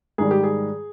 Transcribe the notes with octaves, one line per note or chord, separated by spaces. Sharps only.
G#2 D#3 G3 G#4
G4
G#4